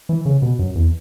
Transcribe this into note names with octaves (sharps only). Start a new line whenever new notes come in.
E3
C#3
B2
F#2
E2